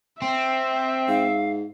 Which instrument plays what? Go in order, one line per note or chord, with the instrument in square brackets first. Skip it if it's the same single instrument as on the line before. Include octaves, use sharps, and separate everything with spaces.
[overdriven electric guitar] C4 [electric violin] E5
[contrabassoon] G#2 [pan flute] F5